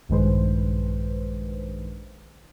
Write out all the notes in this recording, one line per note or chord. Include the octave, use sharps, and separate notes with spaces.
A#1 G2 D#3 G#3 B4 C5